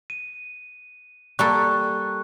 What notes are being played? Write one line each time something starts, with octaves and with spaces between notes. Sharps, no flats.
D#7
G3 A#3 A4 C#6 F#6